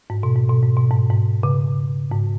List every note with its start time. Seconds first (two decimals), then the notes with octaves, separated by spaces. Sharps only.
0.10 G#2
0.23 B2
0.36 G#2
0.50 B2
0.63 G#2
0.77 B2
0.91 G#2
1.10 G#2
1.43 C#3
2.11 G#2